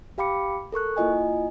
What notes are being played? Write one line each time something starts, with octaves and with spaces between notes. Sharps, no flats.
G4 F5 G5 B5 D6 C#7
A4 A#4 C#6 F#6
A#3 E4 F4 D#5 G#5